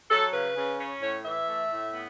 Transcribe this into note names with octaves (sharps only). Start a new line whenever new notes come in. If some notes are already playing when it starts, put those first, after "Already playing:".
F#3 A4
C#3 B4
C#3
C#4
A2 C#5
E3 E5
A3
A2
B3